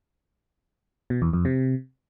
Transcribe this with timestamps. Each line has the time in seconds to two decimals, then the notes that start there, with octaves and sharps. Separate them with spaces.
1.10 B2
1.22 E2
1.33 F2
1.45 C3